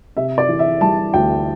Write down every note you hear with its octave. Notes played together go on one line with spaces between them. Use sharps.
C3 E5
D5
E3
E5
G3 A5
D2 G5